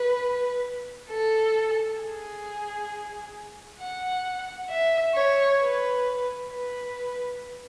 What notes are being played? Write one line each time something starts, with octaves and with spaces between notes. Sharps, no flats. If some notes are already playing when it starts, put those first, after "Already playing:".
Already playing: B4
A4
G#4
F#5
E5
C#5
B4
B4